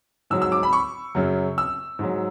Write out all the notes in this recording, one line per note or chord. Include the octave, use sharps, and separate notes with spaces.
G#2 F#3 E6
E6
D6
B5
C#6
F#2 C#3 F#3
E6
G#2 F#3